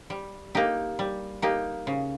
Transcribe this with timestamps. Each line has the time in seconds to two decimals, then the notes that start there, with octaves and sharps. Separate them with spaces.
0.10 G3
0.55 A#3 D#4 G4
0.99 G3
1.42 A#3 D#4 G4
1.87 C#3